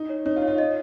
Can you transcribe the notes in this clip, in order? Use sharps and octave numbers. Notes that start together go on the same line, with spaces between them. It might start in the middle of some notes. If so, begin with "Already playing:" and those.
Already playing: D#4
C#5
D#4 C#5
F4
C#5
F4
F4 D#5